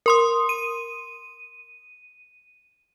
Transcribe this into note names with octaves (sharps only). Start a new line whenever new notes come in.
A#4 C6 D#6
D#7